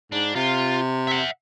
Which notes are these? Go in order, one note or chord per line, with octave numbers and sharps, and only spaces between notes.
G#2 D4
C3 F4
E5 F#5